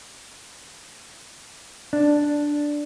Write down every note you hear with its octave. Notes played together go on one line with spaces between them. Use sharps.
D4